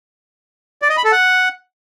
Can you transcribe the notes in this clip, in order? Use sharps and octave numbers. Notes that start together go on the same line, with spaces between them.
D5
D#5
B5
A4
F#5